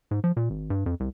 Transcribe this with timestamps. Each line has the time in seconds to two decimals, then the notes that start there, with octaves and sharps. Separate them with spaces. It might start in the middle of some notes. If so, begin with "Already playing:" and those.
0.11 G#2
0.24 F3
0.37 A#2
0.50 G#1
0.70 G2
0.86 F2
1.00 C2